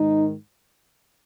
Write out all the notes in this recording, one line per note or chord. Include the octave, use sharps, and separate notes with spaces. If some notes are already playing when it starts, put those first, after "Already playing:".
Already playing: G#2 D#3 D#4